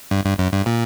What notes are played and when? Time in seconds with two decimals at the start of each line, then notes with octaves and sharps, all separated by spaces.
0.11 G2
0.24 G2
0.38 F#2
0.53 G2
0.66 A#2